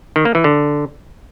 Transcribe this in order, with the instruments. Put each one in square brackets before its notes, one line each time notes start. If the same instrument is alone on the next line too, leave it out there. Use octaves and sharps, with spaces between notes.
[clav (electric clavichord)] D#3
A#3
E3
D3